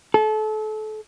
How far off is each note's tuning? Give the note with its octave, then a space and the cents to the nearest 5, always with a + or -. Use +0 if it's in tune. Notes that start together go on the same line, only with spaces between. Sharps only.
A4 -30